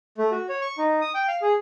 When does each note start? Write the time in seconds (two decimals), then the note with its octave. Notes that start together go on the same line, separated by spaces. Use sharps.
0.18 A3
0.31 F#4
0.49 C#5
0.61 C#6
0.78 D#4
1.01 D#6
1.15 G5
1.28 F5
1.42 G#4